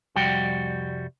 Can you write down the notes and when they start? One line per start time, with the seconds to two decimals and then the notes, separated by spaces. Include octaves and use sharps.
0.16 C2 F2 G3 F#4 G5